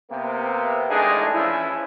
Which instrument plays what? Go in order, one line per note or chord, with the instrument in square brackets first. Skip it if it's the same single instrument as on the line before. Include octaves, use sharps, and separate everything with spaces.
[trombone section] C3 A#3 B3
A1 A2 G#3 D4 D#4 G#4
E3 F3 C#4 E4